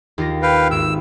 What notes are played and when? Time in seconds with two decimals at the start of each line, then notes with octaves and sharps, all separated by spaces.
0.18 D#2 F4 A#6
0.42 B4 F5 G5
0.71 G#1 E6 D7